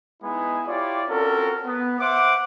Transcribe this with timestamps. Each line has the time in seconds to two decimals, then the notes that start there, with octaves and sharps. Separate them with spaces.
0.22 G#3 B3 D#4 E4 G#5 B5
0.67 E4 F4 G4 C#5 D5
1.09 C4 C#4 F4 F#4 A4 A#4
1.65 B3
1.99 C5 E5 F#5 C6 D6